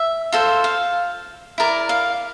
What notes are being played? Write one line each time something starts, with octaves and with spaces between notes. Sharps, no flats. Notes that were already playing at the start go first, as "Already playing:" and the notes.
Already playing: E5
F4 A4 C5
F5
E4 A#4 D5
F5